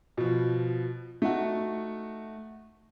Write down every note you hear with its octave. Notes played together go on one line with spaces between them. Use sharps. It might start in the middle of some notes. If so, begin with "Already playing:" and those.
B2 F3
A3 D#4 F#4